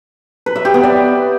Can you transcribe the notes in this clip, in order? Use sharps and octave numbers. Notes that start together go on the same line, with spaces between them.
B4
E5
G4
B3
D5